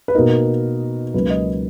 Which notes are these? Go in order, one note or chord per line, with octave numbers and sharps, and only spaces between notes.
B4
B2 A#3 D#4 A#4
C#2 C#3 F#3 A#3 B4
D#5